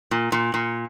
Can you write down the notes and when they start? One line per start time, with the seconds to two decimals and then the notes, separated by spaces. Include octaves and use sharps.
0.11 A#2
0.32 A#2
0.54 A#2